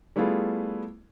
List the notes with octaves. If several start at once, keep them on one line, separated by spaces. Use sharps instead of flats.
G3 A3 B3 E4 F4 G#4